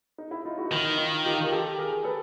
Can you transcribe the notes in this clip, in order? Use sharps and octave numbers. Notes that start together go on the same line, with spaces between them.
D#4
E4
D#4 F4
E4 F#4
D#4
D#3 E4
D#4 F4
F4 G4
A#4
G4 A4
G#4 A#4
A4 B4